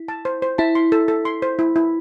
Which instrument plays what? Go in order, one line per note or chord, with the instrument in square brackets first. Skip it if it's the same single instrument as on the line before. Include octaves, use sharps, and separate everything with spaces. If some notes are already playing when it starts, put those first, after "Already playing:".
Already playing: [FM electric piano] E4
[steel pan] A5
C5
C5
[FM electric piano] E4 [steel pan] A5
[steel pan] C6
A4
A4
C6
C5
E4
E4